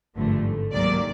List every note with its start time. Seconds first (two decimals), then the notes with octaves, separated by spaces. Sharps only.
0.16 G#1 G2 D3 F3 A3
0.72 C#2 C3 D#3 F#3 A#3 D5